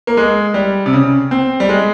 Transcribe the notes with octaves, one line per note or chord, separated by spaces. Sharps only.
A#3
G#3
G3
C3
C#3
C4
G3
G#3